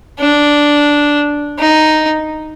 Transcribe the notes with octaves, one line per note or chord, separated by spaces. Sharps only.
D4
D#4